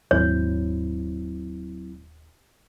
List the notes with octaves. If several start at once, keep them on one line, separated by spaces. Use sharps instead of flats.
D#1 D#2 G#2 F#3 C4 E4 C#5